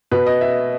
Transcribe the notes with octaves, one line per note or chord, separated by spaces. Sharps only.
B2 B4
D#5
E5